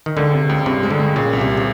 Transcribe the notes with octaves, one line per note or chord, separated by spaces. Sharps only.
D#3
C#2 D3
C3
C#2
G2 C3
G#3
D3
G#3
A#2 C#3
C2
C3
C#3